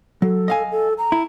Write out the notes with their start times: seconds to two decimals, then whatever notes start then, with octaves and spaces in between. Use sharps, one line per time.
0.22 F#3 A4
0.48 D#5 F5 G#5
0.71 A4
0.98 A#5
1.12 E4